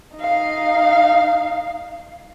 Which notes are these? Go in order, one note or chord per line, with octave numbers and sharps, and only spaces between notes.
D#4 F5